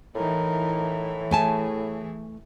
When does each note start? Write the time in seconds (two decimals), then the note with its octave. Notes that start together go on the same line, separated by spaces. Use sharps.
0.15 A2 E3 D#4 A#4
1.31 A3 G#4 G#5 A5